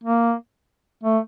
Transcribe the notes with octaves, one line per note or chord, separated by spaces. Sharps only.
A#3
A3